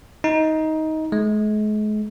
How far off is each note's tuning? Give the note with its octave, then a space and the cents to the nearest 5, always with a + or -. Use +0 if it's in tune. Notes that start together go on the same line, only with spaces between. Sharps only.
D#4 +15
G#3 +40